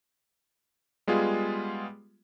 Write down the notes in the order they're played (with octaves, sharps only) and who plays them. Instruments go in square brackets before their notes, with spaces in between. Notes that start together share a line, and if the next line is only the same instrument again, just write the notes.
[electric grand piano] G3 G#3 B3 F4 G#4